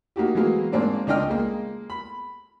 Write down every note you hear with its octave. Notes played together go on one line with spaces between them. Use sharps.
A#3 D#4 F#4 G4
E3 F#3 G#3 A#3
G#2 A#3 C4 D4
C#2 D4 F4 D#5 G5 F6
G#3 A#3
B5